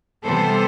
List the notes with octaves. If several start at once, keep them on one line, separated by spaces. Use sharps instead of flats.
C3 E3 G3 B3 A4 C5